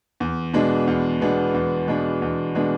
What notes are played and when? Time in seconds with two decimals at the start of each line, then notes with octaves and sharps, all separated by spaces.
0.20 E2
0.53 B2 G#3 B3 D4
0.87 E2
1.21 B2 G#3 B3 D4
1.54 E2
1.88 B2 G#3 B3 D4
2.22 E2
2.55 B2 G#3 B3 D4